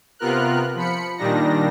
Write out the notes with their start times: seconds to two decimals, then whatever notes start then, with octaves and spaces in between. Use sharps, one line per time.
0.19 C3 B3 F4 A#4 F6 F#6
0.75 F3 B5 C#7
1.18 A#2 D#3 G3 D4 D#4 A#6